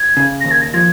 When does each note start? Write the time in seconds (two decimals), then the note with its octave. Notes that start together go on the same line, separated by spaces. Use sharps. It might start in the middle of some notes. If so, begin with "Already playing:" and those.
Already playing: G#6
0.17 C#3
0.41 D#2 A#6
0.51 G#6
0.61 A#6
0.74 F3 G#6